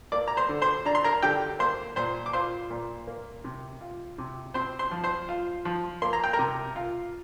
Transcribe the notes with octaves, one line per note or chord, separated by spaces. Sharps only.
A#3 D5 D6
A#5
C5 C6
D3
C5 C6
D4 A#5
C6
A#4 A#5
D3 G4 G5
A#3 C5 C6
A#2 C5 C6
D6
F4 C5 C6
A#2
A#3
C3
F4
C3
C4 C5 C6
C5 C6
F3
C5 C6
F4
F3
A#3 C6
A#5
G5
A#4 A#5
C3
F4